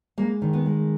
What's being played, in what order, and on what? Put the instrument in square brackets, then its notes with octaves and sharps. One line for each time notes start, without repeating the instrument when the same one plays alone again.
[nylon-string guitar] G#3 A#3
D#3
B3
G#3